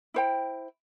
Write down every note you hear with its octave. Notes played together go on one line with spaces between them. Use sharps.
E4 C5 G5